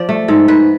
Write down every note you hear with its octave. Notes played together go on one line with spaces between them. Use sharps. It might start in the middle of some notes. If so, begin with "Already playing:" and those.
Already playing: F3 D5
A3
G#2 A4
G#2 B4